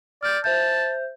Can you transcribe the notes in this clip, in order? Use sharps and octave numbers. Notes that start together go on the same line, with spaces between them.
D5 F6 G6
C5 E5 A5 G6